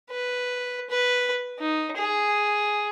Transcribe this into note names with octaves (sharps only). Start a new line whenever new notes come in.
B4
B4
D#4
G#4